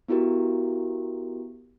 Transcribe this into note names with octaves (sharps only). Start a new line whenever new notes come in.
B3 E4 F#4 G4 A#4